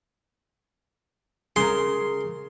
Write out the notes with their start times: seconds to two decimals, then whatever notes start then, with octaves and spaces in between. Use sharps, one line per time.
1.56 C#3 G#4 A#4 C6